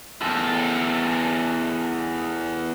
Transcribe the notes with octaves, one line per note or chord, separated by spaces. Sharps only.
E2 A4